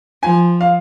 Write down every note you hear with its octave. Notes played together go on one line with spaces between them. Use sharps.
F3 G#5
F5